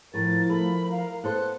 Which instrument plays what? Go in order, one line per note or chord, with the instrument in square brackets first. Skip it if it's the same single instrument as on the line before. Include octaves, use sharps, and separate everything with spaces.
[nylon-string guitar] A2 [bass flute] F3 [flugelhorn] A#4 [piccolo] A6
[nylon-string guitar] A3 [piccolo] B5
[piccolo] F5
[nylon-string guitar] B3 A4 C5 [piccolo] F#6